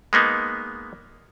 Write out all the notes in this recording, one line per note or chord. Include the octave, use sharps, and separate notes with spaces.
G#3 A#3 B3 D#4